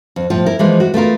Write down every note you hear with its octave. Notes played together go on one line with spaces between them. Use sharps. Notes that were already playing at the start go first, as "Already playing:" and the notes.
F2
A2 F3 F4
E4 A#4
E3 F3 G#3 A#3
F#4
A3 B3 F4 A#4